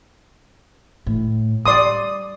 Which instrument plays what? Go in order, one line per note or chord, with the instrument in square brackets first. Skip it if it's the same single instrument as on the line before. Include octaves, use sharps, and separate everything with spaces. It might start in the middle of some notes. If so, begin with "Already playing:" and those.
[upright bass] A2
[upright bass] G3 [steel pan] D5 C6 D#6